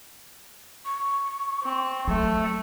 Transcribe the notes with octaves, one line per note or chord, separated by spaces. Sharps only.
C#6
C4
F#3 A3